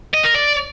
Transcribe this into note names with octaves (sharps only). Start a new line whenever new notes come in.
D#5
A#4
D5